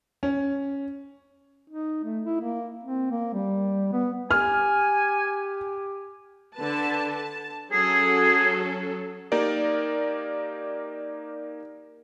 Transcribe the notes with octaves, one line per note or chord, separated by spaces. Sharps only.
C#4
D#4
A3
E4
A#3
C4
A#3
G3
B3
G4 G#5 F6
D3 B4 A5
A5
F#3 C#4 G#4 A4
A#3 D#4 G4 A#4 D5